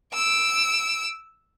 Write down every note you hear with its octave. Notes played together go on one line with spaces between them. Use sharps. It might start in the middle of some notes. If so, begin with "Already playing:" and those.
E6 D7